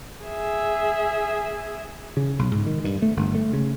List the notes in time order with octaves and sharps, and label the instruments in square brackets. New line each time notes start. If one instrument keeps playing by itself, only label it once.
[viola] G#4 E5
[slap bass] C#3
B1
G#2
D#3
G2
A3
G1
A3
C#3